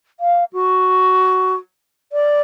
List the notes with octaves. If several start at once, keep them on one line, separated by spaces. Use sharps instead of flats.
F5
F#4
D5